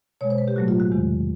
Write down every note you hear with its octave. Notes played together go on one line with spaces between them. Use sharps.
B2 G#3 C#5
C5
B4
G4
A2 F#3 A3 F#4
F4
F#4
E2 C3 D#3 G#3